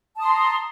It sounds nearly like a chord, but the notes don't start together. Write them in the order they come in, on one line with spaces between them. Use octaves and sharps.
A5 D#6 C6 A#5